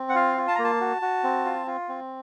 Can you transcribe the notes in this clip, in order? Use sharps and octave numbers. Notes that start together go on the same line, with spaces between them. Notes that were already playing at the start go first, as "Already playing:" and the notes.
Already playing: C4
F#5
F4 F5
F4
A5
A#5
A#3
A5
F#4
F#4
C4
F4
F4
C4